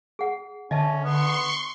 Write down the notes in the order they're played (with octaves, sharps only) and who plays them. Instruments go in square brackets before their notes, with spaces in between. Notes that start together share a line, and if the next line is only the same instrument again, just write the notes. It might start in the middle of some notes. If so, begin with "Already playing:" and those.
[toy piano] G#4 F#5
[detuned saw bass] D3 [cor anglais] C#4 [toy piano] D#5 E5 A5
[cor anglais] B3 [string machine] C6 C#6